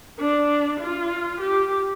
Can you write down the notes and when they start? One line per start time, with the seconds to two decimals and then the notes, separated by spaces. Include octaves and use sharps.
0.19 D4
0.80 F4
1.40 G4